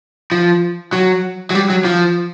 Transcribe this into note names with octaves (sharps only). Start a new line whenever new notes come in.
F3
F#3
F#3
G3
F#3
F3